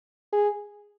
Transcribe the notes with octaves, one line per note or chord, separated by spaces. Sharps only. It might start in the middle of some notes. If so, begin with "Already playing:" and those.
G#4